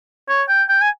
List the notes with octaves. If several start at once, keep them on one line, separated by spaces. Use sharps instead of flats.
C#5
G5
G5
G#5